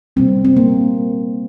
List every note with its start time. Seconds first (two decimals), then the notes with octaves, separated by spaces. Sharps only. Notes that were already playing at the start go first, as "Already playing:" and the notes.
0.16 C3 G3 A#3 C4
0.45 C4
0.57 A#3